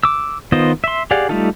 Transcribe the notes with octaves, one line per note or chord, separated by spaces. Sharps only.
D6 E6
D#3 B3 F4 C5 D#5
E5 C6
G4 G#4 D5 F5 F#5
G3 A3 D#4 F4 A4